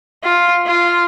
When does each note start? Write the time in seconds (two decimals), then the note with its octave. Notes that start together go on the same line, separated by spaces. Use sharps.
0.24 F4
0.66 F4